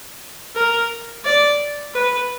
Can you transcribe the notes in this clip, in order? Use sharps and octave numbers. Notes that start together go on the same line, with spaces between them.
A#4
D5
B4